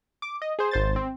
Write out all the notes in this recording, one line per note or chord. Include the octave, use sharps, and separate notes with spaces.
D6
D#5
G#4 C5
G#1 C5 A6
C4